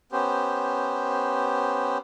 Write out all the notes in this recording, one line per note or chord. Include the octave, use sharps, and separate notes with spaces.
B3 C#4 G4 C5